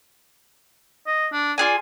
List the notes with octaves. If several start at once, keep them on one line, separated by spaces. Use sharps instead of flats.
D#5
D4
F4 G#4 D5 G#5